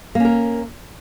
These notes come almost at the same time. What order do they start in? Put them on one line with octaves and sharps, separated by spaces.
A#3 C#4 A#4